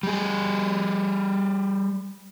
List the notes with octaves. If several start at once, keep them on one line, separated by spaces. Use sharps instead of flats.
G3 G#4